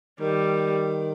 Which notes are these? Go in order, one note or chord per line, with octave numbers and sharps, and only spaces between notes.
D#3 G3